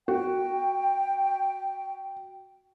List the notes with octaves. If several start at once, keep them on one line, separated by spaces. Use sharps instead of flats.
F#4 G5